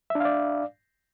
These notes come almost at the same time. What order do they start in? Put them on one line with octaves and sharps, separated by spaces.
E5 D4 F5 D5